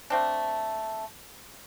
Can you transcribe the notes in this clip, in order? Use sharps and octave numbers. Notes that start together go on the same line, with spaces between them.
A3 C4 D4